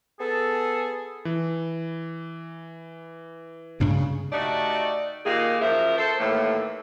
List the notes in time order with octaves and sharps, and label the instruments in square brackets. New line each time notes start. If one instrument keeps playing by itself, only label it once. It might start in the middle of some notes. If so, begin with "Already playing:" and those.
[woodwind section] B3 G#4 A4
[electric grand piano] E3
[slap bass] D2 G2 D4 [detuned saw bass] C#3
[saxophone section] A3 D#4 F#4 G4 D5
A#2 D#3 A#3 G4 G#4
F#2 F3 A#4 E5
A4 C5
D#2 A2 E3 A3 A#3